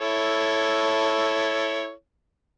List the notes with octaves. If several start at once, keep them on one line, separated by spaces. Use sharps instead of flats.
E4 A4 C#5